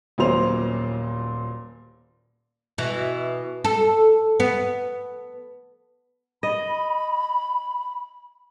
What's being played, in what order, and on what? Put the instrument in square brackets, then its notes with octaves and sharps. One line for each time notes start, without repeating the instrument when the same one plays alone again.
[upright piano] D#1 A#2 F#3 B3 C5 F7
[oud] B2 E3
A4
B3
[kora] D#5 [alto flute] B5